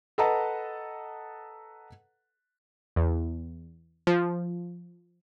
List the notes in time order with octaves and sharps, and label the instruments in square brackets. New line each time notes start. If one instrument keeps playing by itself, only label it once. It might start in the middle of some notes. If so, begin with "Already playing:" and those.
[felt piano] A4 B4 D#5 F#5 A5 A#5
[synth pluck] E2
F3